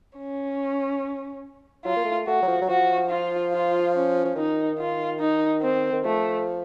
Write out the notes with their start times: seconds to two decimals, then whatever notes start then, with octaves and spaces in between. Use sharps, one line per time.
0.17 C#4
1.85 F#3 F4
1.96 A#3
2.05 A3
2.27 A3 F#4
2.42 F#3
2.48 F3
2.61 F#3
2.69 F3 F#4
3.10 F4
3.53 F4
3.95 C#4
4.25 F3
4.36 D#3 D#4
4.79 F4
5.20 D#4
5.62 C4
5.93 D#3
6.05 F3 A3